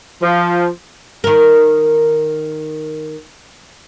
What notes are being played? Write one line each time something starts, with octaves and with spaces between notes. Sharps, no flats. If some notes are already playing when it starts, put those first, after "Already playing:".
F3
D#3 A#4